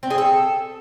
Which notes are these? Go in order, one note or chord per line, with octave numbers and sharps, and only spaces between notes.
C4
G#4
A4